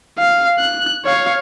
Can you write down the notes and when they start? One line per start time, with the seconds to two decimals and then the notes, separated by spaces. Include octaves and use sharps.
0.19 F5
0.59 F#6
1.05 C#5 F5